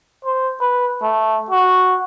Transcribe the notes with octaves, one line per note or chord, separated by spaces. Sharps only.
C5
B4
A3
F#4